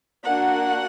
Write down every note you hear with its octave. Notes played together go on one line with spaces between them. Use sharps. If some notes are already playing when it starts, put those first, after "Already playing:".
A#3 D4 F#4 F#5